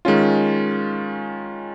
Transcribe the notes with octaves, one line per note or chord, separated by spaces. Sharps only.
D#3 G#3 C#4 F4